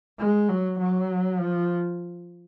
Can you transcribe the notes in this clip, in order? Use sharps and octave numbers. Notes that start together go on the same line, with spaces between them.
G#3
F#3
F#3
F3